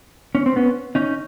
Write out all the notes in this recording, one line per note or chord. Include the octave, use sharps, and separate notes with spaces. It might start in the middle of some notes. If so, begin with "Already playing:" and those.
C#4
C4
B3 C#4
C#4 D#4